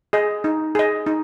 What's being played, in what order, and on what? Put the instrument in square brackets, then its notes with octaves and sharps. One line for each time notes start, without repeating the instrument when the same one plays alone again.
[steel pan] G#4 D#5
D#4
G#4 D#5
D#4